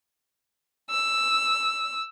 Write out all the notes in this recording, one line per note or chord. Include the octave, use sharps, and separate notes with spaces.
E6